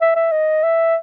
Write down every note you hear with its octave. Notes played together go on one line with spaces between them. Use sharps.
E5
E5
D#5
E5